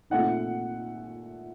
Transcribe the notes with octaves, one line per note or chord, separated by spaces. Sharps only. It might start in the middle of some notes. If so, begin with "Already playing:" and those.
A#2 A3 C4 D#4 F#5